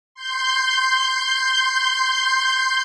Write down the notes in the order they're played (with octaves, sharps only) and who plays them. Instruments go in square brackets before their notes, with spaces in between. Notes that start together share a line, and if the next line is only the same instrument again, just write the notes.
[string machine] C6 G6